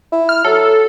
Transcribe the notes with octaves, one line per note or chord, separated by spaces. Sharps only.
E4
F6
F#3 A4